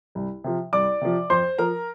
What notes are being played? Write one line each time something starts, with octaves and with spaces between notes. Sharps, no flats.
C2
C3 F3
C2 D5 D6
C3 F3
F2 C5 C6
F3 A#4 A#5